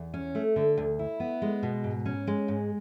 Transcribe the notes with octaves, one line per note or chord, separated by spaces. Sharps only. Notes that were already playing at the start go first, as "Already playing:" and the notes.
Already playing: E2
C#4
A3
D3
D2
E4
B3
G#3
B2
G#2
C#4
G#3
G#2